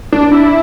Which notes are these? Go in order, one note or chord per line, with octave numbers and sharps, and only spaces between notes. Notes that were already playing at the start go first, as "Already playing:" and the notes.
D4
E4